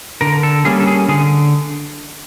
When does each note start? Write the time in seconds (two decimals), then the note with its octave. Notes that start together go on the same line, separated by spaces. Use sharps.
0.21 D3 A#4
0.43 A4
0.65 G3 A#3 C#4 G#4
0.80 A4
0.87 G#4
1.09 D3 G#4